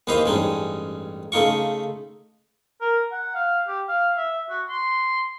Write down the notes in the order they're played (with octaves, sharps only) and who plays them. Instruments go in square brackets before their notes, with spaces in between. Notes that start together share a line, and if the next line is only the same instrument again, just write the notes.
[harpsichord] D#2 E3 B4 C5 D#5 F5
A1 G2 G#3 C#4 D#4
C#3 A3 D#4 F4 C#6
[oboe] A#4
F#5
F5
G4
F5
E5
F#4
C6